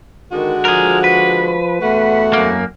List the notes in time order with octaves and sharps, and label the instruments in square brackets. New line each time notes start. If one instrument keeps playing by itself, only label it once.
[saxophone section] D3 G#3 F#4 [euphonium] D#3
[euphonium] F3 [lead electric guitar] G#4 A#4
[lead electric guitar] B4
[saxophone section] E2 F#4 F#5 [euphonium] A3
[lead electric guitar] F#2 A#3